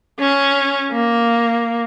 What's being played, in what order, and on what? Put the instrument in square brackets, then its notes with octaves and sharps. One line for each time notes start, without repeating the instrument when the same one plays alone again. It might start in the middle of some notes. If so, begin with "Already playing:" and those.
[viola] C#4
A#3